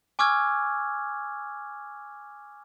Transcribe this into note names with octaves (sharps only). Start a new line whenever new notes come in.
G#5 C#6 D6 E6 F6 G#6